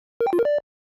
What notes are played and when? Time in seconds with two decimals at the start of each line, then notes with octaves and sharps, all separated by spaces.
0.21 A#4
0.27 G5
0.33 F4
0.39 A#4
0.45 D5